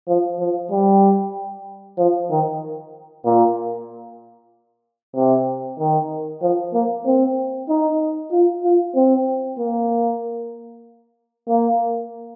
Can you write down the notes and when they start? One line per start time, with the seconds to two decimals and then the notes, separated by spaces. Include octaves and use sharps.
0.09 F3
0.40 F3
0.71 G3
1.98 F3
2.31 D#3
3.26 A#2
5.16 C3
5.79 D#3
6.42 F3
6.74 A#3
7.06 C4
7.70 D#4
8.32 F4
8.64 F4
8.96 C4
9.59 A#3
11.49 A#3